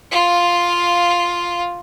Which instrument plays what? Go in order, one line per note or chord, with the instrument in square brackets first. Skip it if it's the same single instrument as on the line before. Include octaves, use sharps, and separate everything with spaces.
[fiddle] F4 F5